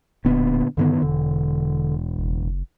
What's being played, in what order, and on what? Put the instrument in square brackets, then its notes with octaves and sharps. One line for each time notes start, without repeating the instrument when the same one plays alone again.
[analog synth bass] D1 [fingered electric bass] A#2 D3 B3
[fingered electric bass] G2 D#3 B3 [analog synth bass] D3
[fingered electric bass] E1 [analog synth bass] D3
[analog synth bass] F#1